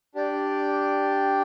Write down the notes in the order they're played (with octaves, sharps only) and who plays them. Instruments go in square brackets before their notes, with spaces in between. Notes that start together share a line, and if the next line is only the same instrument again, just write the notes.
[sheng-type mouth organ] D4 G4 D5 G5